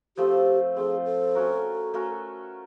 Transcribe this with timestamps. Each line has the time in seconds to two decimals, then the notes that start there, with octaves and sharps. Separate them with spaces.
0.17 F3 A3 C4 G4
0.76 F3 A3 C4 G#4
1.05 A4
1.35 A3 C#4 F#4 A#4
1.94 A3 C#4 F#4 A#4